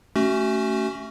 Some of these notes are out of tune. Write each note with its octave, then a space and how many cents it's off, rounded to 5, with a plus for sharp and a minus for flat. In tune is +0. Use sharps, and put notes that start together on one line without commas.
A3 +0 C#4 +0 F#4 +30